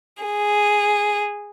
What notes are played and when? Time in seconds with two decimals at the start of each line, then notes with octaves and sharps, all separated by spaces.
0.23 G#4